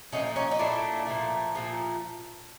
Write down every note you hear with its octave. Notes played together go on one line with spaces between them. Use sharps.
A#2 F3 A3 C#4 D#4
C#4 D#4
D#4
A#2 F3 A3 D4 E4
A#2 F3 A3
A#2 F3 A3